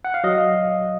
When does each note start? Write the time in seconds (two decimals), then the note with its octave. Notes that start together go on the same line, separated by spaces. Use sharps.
0.05 F#5
0.14 F5
0.24 F#3 D#5
0.38 F5